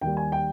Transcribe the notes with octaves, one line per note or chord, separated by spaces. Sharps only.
D#2 D#3 G3 G5
G#5
G5